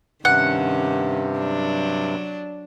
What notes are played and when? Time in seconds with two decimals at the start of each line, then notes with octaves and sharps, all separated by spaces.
0.25 G2 C3 D#3 C#4 F#5
1.39 F#3 D4